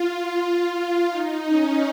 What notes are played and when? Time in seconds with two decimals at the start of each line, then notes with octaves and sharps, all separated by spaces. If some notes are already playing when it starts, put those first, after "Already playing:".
Already playing: F4
1.07 D#4
1.47 C#4